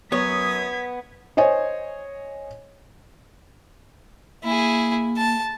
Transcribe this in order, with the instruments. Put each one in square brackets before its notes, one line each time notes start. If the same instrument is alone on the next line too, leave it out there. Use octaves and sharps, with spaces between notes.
[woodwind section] F#2 F#3 D#6 [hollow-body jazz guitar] B3 C#5 [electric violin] G#6 B6
[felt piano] C5 C#5 D#5 G#5
[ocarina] A#3 [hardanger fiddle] E4 G#4
[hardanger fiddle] A5